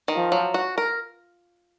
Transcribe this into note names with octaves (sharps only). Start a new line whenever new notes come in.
D#3
F3
F#3
F#4
A#4